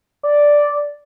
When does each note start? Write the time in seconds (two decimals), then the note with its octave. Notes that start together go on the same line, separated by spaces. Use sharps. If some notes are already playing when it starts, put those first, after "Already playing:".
0.23 D5